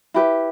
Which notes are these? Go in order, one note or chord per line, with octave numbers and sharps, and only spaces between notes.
E4 G4 B4 B5